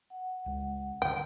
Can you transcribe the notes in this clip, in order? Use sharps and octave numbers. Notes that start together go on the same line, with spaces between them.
F#5
C#2 G#3
G2 D3 G5